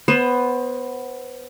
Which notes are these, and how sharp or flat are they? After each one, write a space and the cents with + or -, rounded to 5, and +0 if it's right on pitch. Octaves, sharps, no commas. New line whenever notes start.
B3 +5 C5 +25